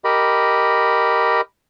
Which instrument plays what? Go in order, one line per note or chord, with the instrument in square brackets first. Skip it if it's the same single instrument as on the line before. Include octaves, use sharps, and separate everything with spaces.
[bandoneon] G4 A#4 D#5 B5